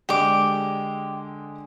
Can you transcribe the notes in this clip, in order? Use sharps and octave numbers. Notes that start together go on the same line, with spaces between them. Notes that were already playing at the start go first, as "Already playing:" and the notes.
D3 G#3 G4 D5 D6